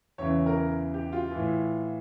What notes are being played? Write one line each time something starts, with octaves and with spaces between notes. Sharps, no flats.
E2 C#3 E3 C#5
A#4
G4
F4
E3
A2